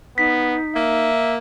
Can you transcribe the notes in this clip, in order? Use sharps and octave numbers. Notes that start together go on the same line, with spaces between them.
B3 D#4 B6
A#3 E5